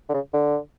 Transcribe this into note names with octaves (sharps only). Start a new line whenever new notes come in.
D3
C#3
D3